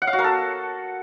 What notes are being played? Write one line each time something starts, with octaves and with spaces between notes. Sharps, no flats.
F#5
F5
F#4
A#4
A4